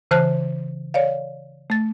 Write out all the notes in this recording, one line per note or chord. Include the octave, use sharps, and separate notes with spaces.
C#3 E3 C5 A5 F6 F#6
C#5 D5 F5
A3 A6